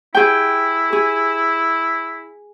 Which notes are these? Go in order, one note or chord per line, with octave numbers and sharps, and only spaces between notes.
E4 G#4 G5
G#4